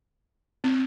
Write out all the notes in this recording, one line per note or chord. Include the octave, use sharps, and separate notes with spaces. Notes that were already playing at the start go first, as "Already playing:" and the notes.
C4